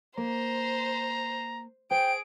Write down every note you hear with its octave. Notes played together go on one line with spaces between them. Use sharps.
A#3 C5 A#5
G#4 C5 G5 D7